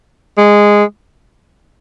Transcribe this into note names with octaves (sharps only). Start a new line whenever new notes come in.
G#3